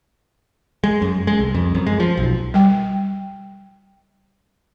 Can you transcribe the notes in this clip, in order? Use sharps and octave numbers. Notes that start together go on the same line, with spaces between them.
G#3
F#2
G#3
C2
F2
F#2
G#3
F3
B1
G3 G5